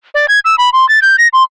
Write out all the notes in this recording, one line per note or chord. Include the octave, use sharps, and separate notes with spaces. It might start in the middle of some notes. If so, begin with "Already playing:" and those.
D5
G#6
E6
B5
C6
A6
G6
A#6
C6